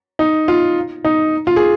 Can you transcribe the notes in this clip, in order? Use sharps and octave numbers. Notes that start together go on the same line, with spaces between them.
D#4
F4
D#4
F4
G#4